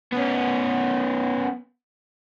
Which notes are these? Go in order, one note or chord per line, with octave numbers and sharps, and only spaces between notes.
B3 C#4